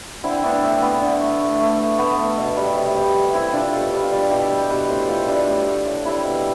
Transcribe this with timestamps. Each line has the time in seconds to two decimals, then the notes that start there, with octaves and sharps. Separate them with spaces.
0.24 D3 C4 E4
0.43 A3 B3 D4
0.63 A3 C4
0.82 A3 B3
1.02 D3
1.21 A3
1.40 A3
1.60 A3
1.79 A3
1.98 A3 B3
2.18 A3
2.37 B2
2.56 G3
2.76 C3
2.96 G3
3.14 G3
3.34 G3 C4 E4
3.53 C3 D4 F4
3.72 B2 F4 A4
3.92 G3
4.02 D4 F4
4.12 G3
4.30 B2 E4 G4
4.50 G3
4.70 B2 G4 B4
4.89 A2 A4 C5
5.08 A2 F4 A4
5.27 G3 D4 F4
5.47 A2
5.67 A2
5.86 A2
6.05 G3 C4 E4
6.25 B2